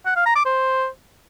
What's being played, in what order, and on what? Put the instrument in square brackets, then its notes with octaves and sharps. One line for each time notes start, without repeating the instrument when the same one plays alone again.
[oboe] F#5
F5
A#5
D6
C5